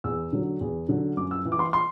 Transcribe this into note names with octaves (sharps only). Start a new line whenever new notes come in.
E2 E6
D3 F#3
E2
D3 F#3
F#2 D6
E6
E3
D6
C6
C6